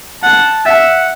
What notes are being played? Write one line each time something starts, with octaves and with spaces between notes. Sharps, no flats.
F#5 A5
E5 F#5